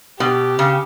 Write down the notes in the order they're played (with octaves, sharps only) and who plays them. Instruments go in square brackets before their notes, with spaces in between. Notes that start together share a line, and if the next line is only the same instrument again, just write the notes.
[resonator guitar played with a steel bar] B2 [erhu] G4
[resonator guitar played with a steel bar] C#3